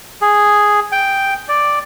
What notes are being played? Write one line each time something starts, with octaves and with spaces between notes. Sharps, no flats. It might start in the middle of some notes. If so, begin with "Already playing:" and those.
G#4
G5
D5